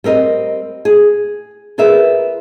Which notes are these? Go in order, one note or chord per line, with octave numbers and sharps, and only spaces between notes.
G3 C4 A#4 D#5
G#4
F4 G#4 A#4 B4 E5